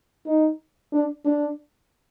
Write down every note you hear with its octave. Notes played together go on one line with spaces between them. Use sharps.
D#4
D4
D4